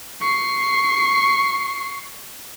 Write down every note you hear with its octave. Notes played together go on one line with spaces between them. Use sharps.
C#6 C7